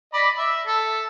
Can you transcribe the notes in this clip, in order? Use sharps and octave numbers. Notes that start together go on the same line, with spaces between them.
D5 D#5 B5
E5
A4